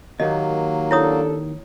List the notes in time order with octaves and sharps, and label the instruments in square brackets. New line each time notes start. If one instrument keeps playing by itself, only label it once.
[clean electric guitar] D#2 [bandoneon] F#3 A#3 [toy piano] D#5
[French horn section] D4 A4 [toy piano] E4 C#5 D#6